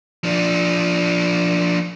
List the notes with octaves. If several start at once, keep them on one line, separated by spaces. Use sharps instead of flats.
F3 D4